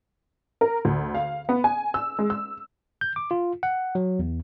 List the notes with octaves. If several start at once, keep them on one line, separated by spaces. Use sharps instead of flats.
A#4
D2
F5
B3
G#5
E6
G#3
E6
G6
D6
F4
F#5
F#3
E2